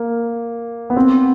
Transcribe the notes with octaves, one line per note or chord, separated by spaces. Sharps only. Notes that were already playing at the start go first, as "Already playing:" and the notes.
Already playing: A#3
B3
C4